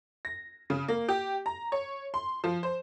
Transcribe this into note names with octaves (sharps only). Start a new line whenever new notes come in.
A#6
C#3
A#3
G4
A#5
C#5
C6
F3
C5